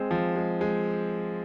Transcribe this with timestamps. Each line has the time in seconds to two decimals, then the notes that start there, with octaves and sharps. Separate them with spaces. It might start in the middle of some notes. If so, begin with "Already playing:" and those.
Already playing: G#3 C4
0.11 F3
0.36 G#3
0.61 G#3